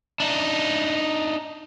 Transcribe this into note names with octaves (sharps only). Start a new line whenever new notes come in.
D4 D#4